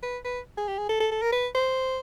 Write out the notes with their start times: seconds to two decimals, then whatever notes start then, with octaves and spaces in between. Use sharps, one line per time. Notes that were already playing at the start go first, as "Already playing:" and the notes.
0.03 B4
0.25 B4
0.57 G#4
0.68 G4
0.78 G#4
0.89 A4
1.00 A4
1.11 A4
1.22 A#4
1.32 B4
1.55 C5